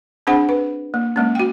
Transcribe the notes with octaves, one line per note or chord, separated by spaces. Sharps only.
C4 D4 G#4 C5 F#5 B5
B4
A#3
G#3 A#3 C#4
F#4 G5